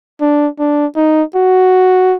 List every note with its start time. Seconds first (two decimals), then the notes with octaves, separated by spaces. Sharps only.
0.21 D4
0.59 D4
0.96 D#4
1.35 F#4